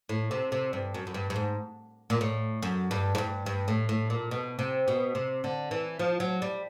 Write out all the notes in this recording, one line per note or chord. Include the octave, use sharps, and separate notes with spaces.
A2
C3
C3
G2
F#2
F#2
G2
G2
G#2
A#2
A2
F#2
G2
G#2
G2
G2
A2
A2
A#2
B2
C3
B2
C3
D3
E3
F3
F#3
G3